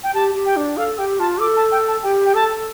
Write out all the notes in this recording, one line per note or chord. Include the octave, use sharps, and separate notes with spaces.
G5
G4 A5
G4
G5
D4
A4 F5
G4 G5
F4 A5
A4 D6
A5
G5
A5
G4 G5
G5
A4 A5